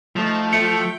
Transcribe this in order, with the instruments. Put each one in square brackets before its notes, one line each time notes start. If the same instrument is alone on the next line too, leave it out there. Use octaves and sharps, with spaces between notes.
[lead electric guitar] F3 [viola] A3 D#4
[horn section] A3 [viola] G5 [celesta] C#7